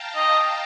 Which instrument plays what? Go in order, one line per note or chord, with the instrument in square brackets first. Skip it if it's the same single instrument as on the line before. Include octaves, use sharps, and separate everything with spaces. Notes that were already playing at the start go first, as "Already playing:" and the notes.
Already playing: [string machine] F5 G5 A5 A#5
[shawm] D#5